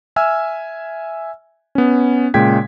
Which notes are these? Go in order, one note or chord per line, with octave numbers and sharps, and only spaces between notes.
E5 G#5 E6 F6
B3 C#4
A#2 C#3 G#3 G5 G#6 B6